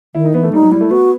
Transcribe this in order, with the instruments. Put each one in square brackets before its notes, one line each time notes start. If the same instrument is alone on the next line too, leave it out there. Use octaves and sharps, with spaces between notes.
[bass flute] D#3 [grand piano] E4
[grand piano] D#4
[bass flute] E3 [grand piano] B3
[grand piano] A3
[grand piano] G3 [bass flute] D#4
[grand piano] F#3
[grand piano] G3 [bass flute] E4
[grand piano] A3
[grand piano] B3 [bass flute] F#4